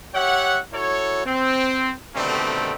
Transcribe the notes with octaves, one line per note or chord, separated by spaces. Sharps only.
G4 C#5 E5 F#5
E4 F#4 A4 C#5
C4
B2 D3 D#3 G3 A3 C4